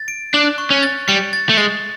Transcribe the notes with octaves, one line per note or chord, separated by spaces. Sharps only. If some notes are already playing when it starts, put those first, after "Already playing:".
Already playing: A6
D7
D4 F#6
C#6
C#4
A6
G3 C#7
A6
A3
G#3 A6